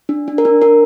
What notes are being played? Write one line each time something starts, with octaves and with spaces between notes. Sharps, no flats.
D4
D4
A#4
D4
D4 A#4